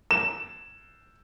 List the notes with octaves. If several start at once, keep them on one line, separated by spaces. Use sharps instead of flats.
E7